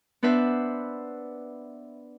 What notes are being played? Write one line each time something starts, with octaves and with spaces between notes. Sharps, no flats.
B3 D4 B4 C5 E5